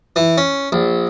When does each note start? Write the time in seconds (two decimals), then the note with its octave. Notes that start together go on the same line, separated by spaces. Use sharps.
0.16 E3
0.38 C#4
0.72 A#1